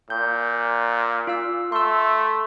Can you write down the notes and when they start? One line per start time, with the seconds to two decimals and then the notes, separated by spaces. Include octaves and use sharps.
0.10 A#2 G6
1.27 F4 F5 E6
1.72 A3 C6 E6